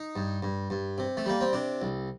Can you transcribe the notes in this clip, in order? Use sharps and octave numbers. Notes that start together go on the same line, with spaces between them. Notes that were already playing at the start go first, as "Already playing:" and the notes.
Already playing: D#4
G2
G2
G2
C3
A3
G3 A#3
C4
C3 D4
C2